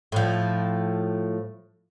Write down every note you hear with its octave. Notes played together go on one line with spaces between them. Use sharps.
A2 F3